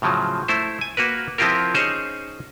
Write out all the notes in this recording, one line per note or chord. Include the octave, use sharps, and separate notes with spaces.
A2 C#3 F3 F#3
A3 E4 C5
G#5
A#3 F#4 A#4 B4
F3 C4 E4 F4 G4 A#4
C#4 D#4 G#4 C5 C#5